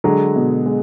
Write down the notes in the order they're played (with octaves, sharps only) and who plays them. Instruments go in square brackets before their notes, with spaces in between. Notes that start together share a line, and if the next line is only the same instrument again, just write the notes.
[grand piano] D3 F#3 [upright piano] G#3
[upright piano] B2
G#3